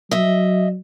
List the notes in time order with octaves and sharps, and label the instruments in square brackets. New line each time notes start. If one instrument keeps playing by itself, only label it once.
[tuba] F#3 [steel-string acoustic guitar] D#5 E5